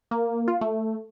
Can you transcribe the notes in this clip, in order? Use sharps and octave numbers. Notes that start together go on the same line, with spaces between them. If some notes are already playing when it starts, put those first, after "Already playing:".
A#3
F4
A3